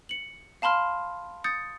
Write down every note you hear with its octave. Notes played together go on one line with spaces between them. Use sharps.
C#7 F#7
F5 A5 B5 C6 F6
D#6 G6 A6 C#7